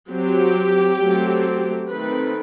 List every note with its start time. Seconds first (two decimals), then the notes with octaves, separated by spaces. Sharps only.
0.11 F#3 C4 G4
0.99 F#3 A3 C4
1.87 D#3 A3 C4 B4